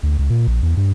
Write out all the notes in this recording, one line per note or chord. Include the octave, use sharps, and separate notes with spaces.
D2
C#2
A#2
A#1
E2
G2